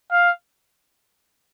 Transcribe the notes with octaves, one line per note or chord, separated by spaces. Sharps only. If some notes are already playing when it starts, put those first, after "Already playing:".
F5